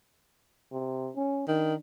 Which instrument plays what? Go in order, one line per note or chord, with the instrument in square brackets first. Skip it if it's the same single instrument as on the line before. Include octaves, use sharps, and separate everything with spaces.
[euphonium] C3
C#4
[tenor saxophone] D#3 [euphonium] D4